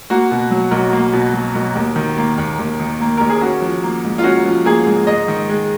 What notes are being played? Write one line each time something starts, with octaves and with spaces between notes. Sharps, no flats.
A#3 F#4
B2
F#3
B1
A#3
B2
F#3
B1
D#2
D#3
A#3
D#2
D#2
D#3
A#3
D#2 A#4
G#4
C#4 F#4
F3
A#3
G#2
F4
C#4 F#4
F3
A#3 G#4
G#2
G#2 D#5
D#3
G#3